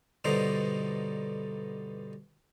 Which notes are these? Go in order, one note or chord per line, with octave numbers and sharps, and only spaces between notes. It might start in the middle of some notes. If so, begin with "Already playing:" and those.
G2 B2 D3 D#4 C5 A#5